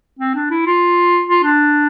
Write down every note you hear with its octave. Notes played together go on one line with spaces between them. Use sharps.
C4
D4
E4
F4
F4
D4